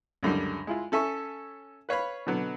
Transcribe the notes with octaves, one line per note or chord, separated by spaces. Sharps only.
C#2 F#2 D3 G3
G#3 E4 F4
C#4 A4 E5 G#5 C#6
B4 C#5 F5 B5
B2 D3 F#3 B3